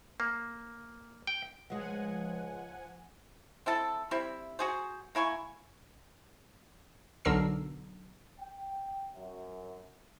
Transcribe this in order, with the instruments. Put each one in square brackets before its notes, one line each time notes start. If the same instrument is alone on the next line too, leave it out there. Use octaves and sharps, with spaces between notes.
[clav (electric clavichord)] A#3
G5
[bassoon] C#2 [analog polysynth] F3 F#5 G#5 [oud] G#3 F#4
[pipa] C4 E4 A4
G3 C4 E4 E5
F#4 G#4 C5
A#3 E4 G#5 C#6
[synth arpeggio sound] B1 D3 A#4 E6 C7
[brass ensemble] G5
F#2